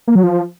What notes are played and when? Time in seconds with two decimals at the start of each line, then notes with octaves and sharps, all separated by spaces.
0.07 A#3
0.15 F#3
0.23 F3